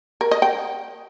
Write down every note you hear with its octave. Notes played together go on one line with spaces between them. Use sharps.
A#4
D#5
G5